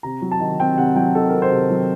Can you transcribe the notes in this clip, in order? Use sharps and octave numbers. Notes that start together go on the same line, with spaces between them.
C3 A#5
F#3
A5
D#3
C4 G5
C3 F#5
F#3 G5
D#3 A4
C4 A#4
C5
C3
F#3